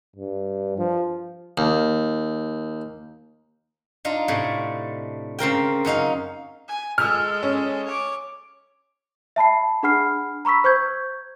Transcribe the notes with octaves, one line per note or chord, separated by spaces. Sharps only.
G2
F3
D#2
D4 D#4 F4
A2 C3 A3
C#3 C4 A#4 G5
F#2 C#4 D#4 F5
G#5
G#3 A4 E6 F6
C#4
C#5 D6
E5 A5 B5 C7
D4 G#4 F#5 B5 F6 C7
A#5 B5 C#6 E6 B6
C5 C#6 G6 G#6